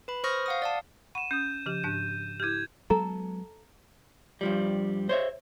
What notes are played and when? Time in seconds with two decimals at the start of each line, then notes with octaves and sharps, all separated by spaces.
0.08 B4 B5
0.24 C5 C#6 D#6 F6 A#6
0.46 F5 F#5 D#6
0.62 D5 F5 A5
1.15 F#5 B5 C#6 D#7 E7
1.31 C#4 D#6 G6
1.66 C#3 F3 G4
1.83 G#2 D4 F#6
2.40 E4 G4 G6 G#6
2.90 F#3 G#3 B3 A4 A#5
4.41 G2 F3 G3
5.09 C5 C#5 E5